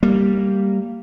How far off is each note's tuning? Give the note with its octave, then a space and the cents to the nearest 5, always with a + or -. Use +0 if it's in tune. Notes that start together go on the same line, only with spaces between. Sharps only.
G3 +0 A#3 -10